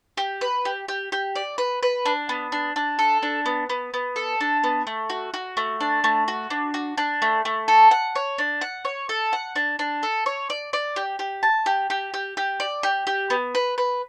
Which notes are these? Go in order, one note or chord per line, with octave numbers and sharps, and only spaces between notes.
G4
B4
G4
G4
G4
D5
B4
B4
D4
B3
D4
D4
A4
D4
B3
B3
B3
A4
D4
B3
A3
F#4
F#4
A3
D4
A3
F#4
D4
F#4
D4
A3
A3
A4
F#5
C#5
D4
F#5
C#5
A4
F#5
D4
D4
A4
C#5
D5
D5
G4
G4
A5
G4
G4
G4
G4
D5
G4
G4
B3
B4
B4